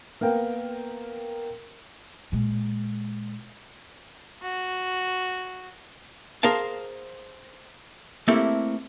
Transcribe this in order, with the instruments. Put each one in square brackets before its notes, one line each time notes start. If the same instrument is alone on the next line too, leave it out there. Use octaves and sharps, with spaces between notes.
[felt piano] A#3 B3 A#4 G5
[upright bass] A#2 G#3
[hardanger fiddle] F#4
[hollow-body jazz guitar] G#4 A#4 C5 F5 A5
A3 A#3 C4 E4 G4 A4